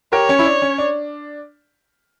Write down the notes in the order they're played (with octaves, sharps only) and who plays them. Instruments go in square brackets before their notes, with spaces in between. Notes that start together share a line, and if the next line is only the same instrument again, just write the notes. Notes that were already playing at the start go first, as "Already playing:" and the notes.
[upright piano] G4 A#4 [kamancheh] C#5
[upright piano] C#4
E4
D4
C#4
D4